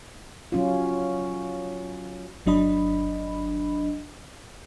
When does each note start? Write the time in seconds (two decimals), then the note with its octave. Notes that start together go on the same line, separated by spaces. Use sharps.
0.52 F#3 C#4 F4
2.46 G1 F#3 D4 D#5 B5